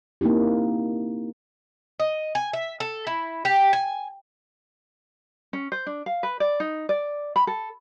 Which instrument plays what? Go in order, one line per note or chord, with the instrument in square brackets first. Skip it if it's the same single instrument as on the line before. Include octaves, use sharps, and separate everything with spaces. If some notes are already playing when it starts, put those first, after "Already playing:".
[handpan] A#3 C4 D#4 E4 G4
[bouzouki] D#5
G#5
E5
A4
E4
G4
G#5
[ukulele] C#4
C5
D4
F5
B4
D5
D#4
D5
B5
A4